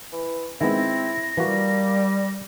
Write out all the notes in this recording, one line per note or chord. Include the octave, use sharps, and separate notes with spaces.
E3
D#3 G#3 B3 C4 E4 A#6
E3 G3 A#3 F#4